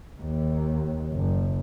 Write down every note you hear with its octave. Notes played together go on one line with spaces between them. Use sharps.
D#2
F#1